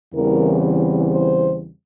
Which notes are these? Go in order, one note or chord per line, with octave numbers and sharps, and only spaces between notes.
E2 C#3 E3 G3 C4 A#4
C5